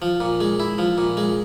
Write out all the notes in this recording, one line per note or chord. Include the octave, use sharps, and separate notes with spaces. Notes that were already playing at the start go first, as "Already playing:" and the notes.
F3
A#2
G#3
E4
F3
A#2
G#3